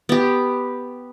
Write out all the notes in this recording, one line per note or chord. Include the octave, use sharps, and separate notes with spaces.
B3 G4